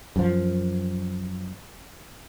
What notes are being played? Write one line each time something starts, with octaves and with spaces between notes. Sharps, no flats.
F#2 F3